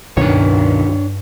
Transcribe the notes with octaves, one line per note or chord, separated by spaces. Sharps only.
C#2 G2 B2 D#3 D4 C#5